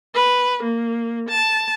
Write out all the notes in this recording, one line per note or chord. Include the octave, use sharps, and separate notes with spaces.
B4
A#3
A5